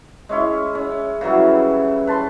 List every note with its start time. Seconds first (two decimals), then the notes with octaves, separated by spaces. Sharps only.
0.29 G#3 C#4 E4 C#5
0.75 C#4
1.21 C#3 E3 F#3 G3
2.07 B4 A5 C6